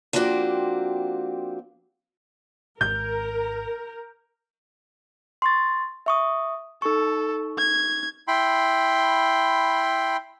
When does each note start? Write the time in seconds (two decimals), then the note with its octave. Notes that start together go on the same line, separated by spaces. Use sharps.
0.13 F3 A#3 C4 D4 F#4 G4
2.81 G#1 A#4 G6
5.42 C6 C#6 A6
6.06 E5 C#6 D#6
6.82 D#4 A4 C#6
7.58 G#6
8.28 E4 G5 B5 C6